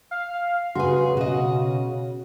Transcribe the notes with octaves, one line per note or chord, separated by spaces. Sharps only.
F5
C#3 F#4 G#4 B4 C6
B2 F#4 D#5